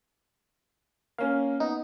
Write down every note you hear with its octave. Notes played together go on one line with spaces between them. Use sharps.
A#3 C#4 F5
B3 D#4